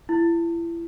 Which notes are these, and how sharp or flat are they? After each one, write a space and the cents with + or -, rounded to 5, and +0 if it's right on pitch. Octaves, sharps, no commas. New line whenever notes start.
E4 +30